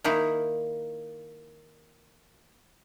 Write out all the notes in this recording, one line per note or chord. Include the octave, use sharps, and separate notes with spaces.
D#3 A#3 D#4 E4